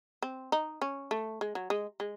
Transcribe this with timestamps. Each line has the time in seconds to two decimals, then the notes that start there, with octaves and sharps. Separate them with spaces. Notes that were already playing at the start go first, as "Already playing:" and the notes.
0.22 C4
0.52 D#4
0.82 C#4
1.11 A3
1.41 G#3
1.55 F#3
1.70 G#3
2.00 G#3